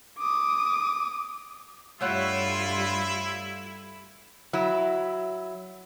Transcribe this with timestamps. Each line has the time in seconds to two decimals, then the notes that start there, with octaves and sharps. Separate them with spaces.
0.18 D6 D#6
2.01 G2 G3 A3 E4 F4 C#5 F#5
4.53 F#3 E4